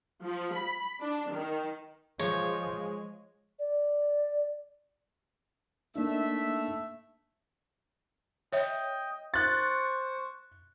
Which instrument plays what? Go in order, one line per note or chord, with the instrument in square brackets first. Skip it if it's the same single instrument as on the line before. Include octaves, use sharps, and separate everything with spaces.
[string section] F3
B5
D4
D#3
[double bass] F3 [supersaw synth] G#3 [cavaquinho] C#5
[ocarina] D5
[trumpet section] A3 E5 [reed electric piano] A#3 D4 D#4
[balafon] C#5 E5 [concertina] D#5 G5
[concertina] C5 C#6 [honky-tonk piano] F#6 A6